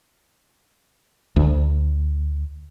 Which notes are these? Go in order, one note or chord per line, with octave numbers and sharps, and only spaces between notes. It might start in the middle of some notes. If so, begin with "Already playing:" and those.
D2